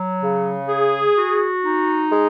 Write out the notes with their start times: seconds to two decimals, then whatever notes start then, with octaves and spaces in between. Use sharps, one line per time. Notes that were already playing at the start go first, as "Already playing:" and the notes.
Already playing: F#3
0.21 C#3
0.68 G#4
1.15 F#4
1.63 D#4
2.10 G#3